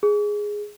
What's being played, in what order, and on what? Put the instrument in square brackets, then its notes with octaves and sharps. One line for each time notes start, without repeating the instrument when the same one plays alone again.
[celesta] G#4